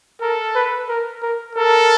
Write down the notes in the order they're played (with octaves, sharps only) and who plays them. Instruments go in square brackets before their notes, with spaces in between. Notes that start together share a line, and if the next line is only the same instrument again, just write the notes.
[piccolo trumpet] A4 [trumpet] A#4
[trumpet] B4
A#4
A#4
[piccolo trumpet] A4 [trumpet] A#4